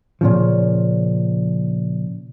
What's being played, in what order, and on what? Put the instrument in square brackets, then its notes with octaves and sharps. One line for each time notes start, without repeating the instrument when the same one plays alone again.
[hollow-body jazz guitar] A#2 C#3 F3